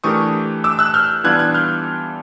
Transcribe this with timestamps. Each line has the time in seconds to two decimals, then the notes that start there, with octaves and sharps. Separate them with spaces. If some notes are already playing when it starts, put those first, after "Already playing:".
0.04 E3 A3 D4 G4 A#4 C#6 D#6
0.64 D6 E6
0.79 E6 F#6
0.94 F6 G6
1.24 E3 G3 B3 D4 F4 F#6 G#6
1.39 F#6 G#6
1.54 F6 G6